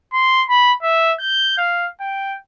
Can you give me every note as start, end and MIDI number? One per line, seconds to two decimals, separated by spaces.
0.13 0.44 84
0.49 0.73 83
0.83 1.13 76
1.19 1.55 91
1.58 1.87 77
2.01 2.35 79